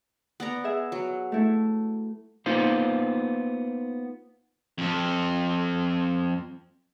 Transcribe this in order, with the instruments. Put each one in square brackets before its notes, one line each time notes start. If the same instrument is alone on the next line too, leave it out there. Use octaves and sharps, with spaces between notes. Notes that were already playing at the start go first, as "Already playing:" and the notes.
[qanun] B3 D5 A#5
[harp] G#4 E5
[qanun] F#3
[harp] A3 E4
[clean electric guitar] A#3 B3 D#4 F4 C5 F5
[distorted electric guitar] F2 A4